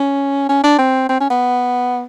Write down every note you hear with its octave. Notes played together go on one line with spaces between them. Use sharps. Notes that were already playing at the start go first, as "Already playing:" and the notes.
Already playing: C#4
C#4
D4
C4
C4
C#4
B3